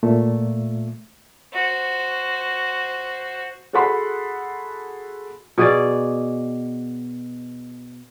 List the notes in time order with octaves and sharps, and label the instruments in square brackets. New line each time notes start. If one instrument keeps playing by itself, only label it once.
[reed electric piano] A#2 A3
[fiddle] F#4 C5
[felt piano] F#4 G#4 A4 F#5 B5 C6
[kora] B2 G#4 D5